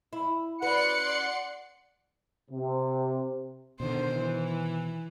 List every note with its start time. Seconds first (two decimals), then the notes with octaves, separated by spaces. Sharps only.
0.13 E4
0.62 C#4 F#4 B4 D5 F#5 C6 C#7
2.51 C3
3.80 B2 D3 D#3 C5
4.15 E3